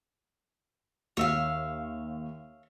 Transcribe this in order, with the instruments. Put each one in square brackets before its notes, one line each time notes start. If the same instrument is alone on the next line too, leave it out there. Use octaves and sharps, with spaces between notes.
[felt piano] D#2 [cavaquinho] C#5 E5 F5